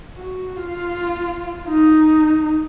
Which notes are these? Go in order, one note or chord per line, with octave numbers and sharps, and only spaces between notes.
F#4
F4
D#4